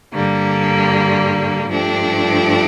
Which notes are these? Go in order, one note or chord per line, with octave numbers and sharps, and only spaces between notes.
G2 D3 G3 A#3
G2 F3 A3 D4 G4